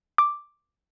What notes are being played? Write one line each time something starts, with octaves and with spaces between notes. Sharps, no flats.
D6